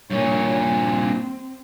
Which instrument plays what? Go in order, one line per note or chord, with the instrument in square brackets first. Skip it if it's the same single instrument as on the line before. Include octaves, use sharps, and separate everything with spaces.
[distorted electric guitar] G2 A#2 [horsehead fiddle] C#5
[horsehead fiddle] C4